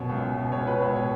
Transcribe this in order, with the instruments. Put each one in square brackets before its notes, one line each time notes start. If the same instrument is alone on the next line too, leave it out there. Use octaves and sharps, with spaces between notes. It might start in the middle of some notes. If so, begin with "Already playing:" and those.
Already playing: [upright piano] F#2 B2 C#5
C#2
C#2
B2
C#2 C#5
B2 B4
C#2 C#5
B2 C#5